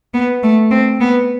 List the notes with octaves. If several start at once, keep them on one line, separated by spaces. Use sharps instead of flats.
B3
A3
C4
B3